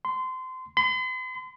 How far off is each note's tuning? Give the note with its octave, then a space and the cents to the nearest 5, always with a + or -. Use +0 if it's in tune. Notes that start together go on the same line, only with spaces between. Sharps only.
C6 -25
C6 -45